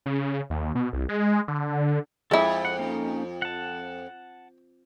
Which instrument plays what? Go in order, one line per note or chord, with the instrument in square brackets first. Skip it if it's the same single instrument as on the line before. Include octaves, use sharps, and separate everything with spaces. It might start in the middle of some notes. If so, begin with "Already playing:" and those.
[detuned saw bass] C#3
D#2
B2
C2
G#3
D3
[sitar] F2 [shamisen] G#3 E4 [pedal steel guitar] A4 G#5
[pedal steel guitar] F#5
A#3 C#4 D#4
F#5 A5